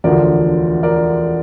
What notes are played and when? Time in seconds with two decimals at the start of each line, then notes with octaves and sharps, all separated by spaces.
0.04 E1 D2 D3 F3 A#4 D5
0.83 A#4 D5